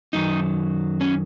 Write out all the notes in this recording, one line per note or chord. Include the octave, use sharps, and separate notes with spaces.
F#2 D#3 F#3 D#4
C#4